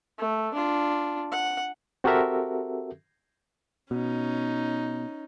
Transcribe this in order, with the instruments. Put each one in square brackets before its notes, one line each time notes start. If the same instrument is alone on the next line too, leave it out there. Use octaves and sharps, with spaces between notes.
[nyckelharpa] A3
D4 F4
F#5
[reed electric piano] C4 F#4 G4 A4 A#4 E5
[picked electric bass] B2 [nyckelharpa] C#4 D#4